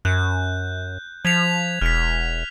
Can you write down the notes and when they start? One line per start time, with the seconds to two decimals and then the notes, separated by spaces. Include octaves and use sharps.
0.05 F#2 F#6 G6
1.25 F3 G#6 B6 F7
1.81 E1 F6 B6